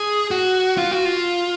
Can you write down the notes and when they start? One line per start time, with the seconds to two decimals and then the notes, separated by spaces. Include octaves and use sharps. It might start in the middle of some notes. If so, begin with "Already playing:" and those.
Already playing: G#4
0.31 F#4
0.77 F4
0.91 F#4
1.05 F4